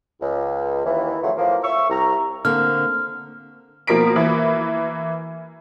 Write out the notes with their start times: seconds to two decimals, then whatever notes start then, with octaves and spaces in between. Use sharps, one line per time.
0.21 C#2
0.84 D#2 E3
1.21 C#3 F3 F#3 A3
1.37 F#2 A2 F3 A#3
1.62 E5 C#6
1.89 C2 A#5
2.45 D3 A#3 C4 F6
3.87 B2 F3 A#3 A#4 B6 D7
4.16 E3 A#3